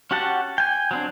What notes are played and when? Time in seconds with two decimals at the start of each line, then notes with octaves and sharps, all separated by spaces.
0.11 C#4 F#4 G4 F#5 A5
0.58 G5 G#5
0.91 F#3 C4 D4